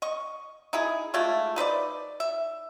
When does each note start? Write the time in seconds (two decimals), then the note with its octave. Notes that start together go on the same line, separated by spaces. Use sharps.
0.02 D#5 C#6
0.73 D#4 E4 G#4
1.14 G#3 A3 F4 G4
1.56 D#4 B4 C5 D5
2.20 E5